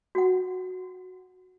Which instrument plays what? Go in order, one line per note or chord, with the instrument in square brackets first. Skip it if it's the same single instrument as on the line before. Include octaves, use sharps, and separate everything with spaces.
[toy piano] F#4 F#5